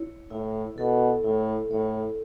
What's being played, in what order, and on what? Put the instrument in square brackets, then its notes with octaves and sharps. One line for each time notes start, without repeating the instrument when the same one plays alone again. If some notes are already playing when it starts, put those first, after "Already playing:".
Already playing: [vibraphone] E4 C#5
[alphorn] A2 [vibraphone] E4
[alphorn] B2 [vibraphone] A4
[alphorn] A2 [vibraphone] E4
[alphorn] A2 [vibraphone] C#5